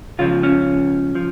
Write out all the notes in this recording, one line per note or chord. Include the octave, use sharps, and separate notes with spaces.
C#2 C#3 F3 F4
C#4
F3